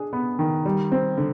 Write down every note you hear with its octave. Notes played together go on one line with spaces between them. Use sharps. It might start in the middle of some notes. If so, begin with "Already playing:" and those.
Already playing: D4 G#4
B3
D#3
G3
C4
D3